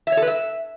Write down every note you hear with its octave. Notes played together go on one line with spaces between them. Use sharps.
E5
C#5
A4
B4
E5